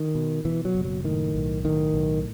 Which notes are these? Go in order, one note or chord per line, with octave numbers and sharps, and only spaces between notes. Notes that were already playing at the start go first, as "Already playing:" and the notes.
Already playing: D#3
B2
B2 E3
F#3
F#1
F#3
A2 D#3
B1
A2 D#3
B1